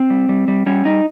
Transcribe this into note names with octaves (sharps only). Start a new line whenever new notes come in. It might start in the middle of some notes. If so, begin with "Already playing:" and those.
Already playing: C4
G3
G3
G3
G3 C#4
G3 D#4